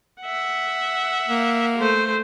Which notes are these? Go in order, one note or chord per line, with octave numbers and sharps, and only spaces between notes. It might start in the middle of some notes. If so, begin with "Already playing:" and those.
E5 F#5
A#3
A3 C5